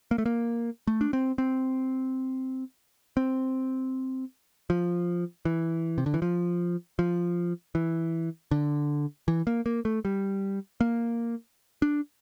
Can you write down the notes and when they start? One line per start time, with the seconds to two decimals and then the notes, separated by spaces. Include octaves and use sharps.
0.11 A#3
0.18 A3
0.26 A#3
0.87 A3
1.01 D4
1.13 C4
1.38 C4
3.17 C4
4.70 F3
5.45 E3
5.98 C3
6.06 D3
6.14 E3
6.22 F3
6.99 F3
7.75 E3
8.51 D3
9.28 E3
9.47 A#3
9.66 A#3
9.85 A3
10.05 G3
10.81 A#3
11.82 D4